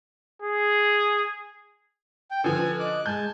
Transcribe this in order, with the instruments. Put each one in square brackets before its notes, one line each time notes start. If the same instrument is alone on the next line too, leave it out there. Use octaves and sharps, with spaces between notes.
[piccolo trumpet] G#4
[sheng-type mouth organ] G5
[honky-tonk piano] D3 F3 [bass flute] B4 [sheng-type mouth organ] G#5
[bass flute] B4
[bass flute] D#5 [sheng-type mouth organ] D6 F#6
[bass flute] G#3 [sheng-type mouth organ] G#5 A5 [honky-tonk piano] G6